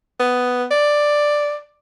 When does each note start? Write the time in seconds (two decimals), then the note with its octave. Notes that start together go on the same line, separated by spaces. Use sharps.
0.20 B3
0.71 D5